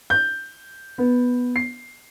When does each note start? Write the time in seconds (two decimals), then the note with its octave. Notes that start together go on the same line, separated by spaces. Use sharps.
0.10 G6
0.98 B3
1.56 C7